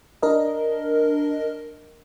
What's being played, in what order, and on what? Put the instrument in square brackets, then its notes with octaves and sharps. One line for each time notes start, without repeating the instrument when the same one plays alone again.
[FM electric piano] D4 A#4 D#5